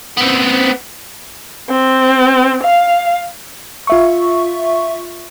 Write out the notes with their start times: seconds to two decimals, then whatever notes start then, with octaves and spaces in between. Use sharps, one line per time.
0.17 B3 C4
1.70 C4
2.63 F5
3.87 F4 E5 C#6